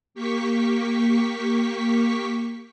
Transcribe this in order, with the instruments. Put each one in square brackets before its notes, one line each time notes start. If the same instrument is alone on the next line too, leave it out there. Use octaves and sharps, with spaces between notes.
[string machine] A#3 G4 C#6 B6